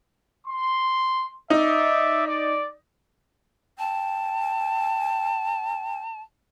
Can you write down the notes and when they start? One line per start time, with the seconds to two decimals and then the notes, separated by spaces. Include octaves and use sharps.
0.47 C6
1.50 D#4 D5 E5
2.27 D5
3.79 G5 A5